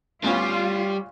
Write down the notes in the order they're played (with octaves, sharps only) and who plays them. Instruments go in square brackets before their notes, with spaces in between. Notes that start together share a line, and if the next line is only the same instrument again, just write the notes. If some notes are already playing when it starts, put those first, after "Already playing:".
[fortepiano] D2 B3 C#4 [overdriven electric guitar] G3 [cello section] F4